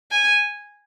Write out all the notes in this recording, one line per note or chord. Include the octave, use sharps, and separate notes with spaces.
G#5